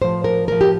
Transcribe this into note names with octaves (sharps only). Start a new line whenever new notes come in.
A2 F3 C5
A#4
A2 F3 A#4
G4